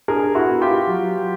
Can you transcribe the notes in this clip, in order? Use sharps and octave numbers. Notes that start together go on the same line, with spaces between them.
D4 G#4 A#4
E4 F#4
B3
F4 G4
F#3